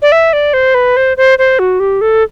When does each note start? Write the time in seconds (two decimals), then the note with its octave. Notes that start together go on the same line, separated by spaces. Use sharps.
0.02 D5
0.12 E5
0.33 D5
0.54 C5
0.75 B4
0.97 C5
1.17 C5
1.39 C5
1.59 F#4
1.80 G4
2.01 A4